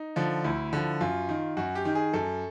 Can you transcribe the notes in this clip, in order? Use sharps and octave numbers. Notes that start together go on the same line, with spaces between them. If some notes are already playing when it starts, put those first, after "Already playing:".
Already playing: D#4
D3 F3
D2 E4
D3 F3
F#2 F4
D#3
F#2 F#4
G4
D#3
G#4
F#2 A4